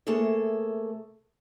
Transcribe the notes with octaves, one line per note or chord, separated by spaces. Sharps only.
C3 A3 A#3 G#4 A4